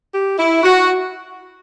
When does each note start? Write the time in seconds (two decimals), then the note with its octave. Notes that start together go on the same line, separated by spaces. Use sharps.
0.13 G4
0.38 E4
0.63 F#4